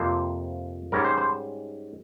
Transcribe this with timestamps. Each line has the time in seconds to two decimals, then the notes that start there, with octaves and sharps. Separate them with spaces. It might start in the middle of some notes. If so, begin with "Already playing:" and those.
Already playing: F2 C3 F3 A#3 C5
0.92 G#2 G3 C#4 A#4
1.05 C5
1.18 C5